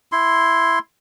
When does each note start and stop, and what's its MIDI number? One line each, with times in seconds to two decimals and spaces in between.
0.12 0.79 64
0.12 0.79 84